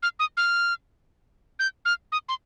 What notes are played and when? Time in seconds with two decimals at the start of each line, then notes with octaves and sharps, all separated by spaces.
0.03 F6
0.19 D#6
0.37 F6
1.59 G6
1.85 F6
2.12 D#6
2.29 C6